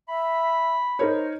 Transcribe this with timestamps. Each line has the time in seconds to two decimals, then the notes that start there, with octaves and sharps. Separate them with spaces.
0.08 E5 B5
0.99 D#4 A#4 C5 C#5